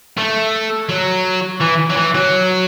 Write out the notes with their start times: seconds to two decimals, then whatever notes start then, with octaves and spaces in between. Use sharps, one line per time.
0.18 A3
0.89 F#3
1.60 E3
1.90 F#3
1.96 E3
2.15 F#3